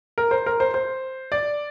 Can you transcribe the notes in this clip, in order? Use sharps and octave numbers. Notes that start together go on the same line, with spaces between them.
A#4
C5
A#4
C5
C5
D5